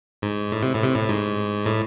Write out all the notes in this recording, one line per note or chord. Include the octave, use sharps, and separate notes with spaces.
G#2
A2
C3
A2
C3
A2
G#2
A2